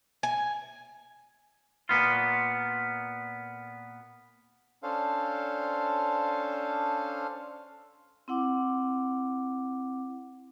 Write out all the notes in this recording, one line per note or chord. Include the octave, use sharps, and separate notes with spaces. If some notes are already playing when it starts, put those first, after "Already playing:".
G#5
A#2 B3 F4
C#4 D4 A4 C5 F5
C4 E4 F#5 D6